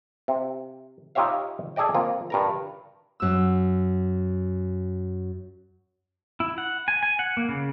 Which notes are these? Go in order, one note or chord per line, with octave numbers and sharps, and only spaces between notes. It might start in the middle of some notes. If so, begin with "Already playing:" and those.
C3
D#4 F4 G4 C#5 E5 F5
G#4 A4 D5 D#5 G5
A#3 C4 F4
G2 A#4 A#5
F#2 E6
E4
F#5
G#5
G#5
F#5
A#3
C#3